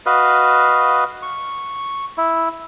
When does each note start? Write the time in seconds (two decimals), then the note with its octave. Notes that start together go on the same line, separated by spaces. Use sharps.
0.06 F#4 B4 D#5 F5
1.23 C#6
2.18 E4